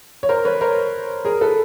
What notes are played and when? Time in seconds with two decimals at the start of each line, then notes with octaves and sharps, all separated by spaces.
0.23 C#5
0.29 A#4 C5
0.45 B4 C#5
0.61 A#4 C5
1.25 G#4 A#4
1.41 A4 B4